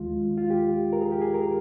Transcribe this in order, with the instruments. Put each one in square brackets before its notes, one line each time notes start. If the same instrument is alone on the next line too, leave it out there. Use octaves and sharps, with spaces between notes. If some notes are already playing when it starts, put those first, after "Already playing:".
Already playing: [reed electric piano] D#2 D#3 G#3 F4
F4
G4
A#4
G#4
G4
G#4
A#4